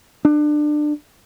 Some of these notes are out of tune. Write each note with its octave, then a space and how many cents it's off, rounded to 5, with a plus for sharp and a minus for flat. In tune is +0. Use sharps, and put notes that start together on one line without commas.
D4 +25